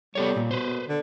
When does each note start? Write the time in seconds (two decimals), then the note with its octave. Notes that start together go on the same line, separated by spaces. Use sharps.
0.15 G3 B3 A4 C#5
0.36 A#2
0.51 B2 B4 C5
0.88 D3